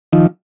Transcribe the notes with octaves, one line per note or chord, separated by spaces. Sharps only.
D#3 F3